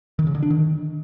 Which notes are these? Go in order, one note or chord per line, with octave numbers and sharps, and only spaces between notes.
D#3
C#3
D3
D4
D#3